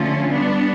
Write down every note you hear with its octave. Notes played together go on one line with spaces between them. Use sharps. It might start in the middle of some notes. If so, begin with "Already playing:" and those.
Already playing: D3 F3 A3 C#4 F4
G3 B3 D4